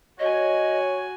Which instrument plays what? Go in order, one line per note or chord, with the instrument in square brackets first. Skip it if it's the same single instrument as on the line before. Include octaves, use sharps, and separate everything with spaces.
[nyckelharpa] F#4 G#5 [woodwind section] C#5 [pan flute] D#5